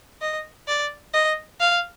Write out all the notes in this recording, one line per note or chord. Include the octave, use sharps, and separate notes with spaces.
D#5
D5
D#5
F5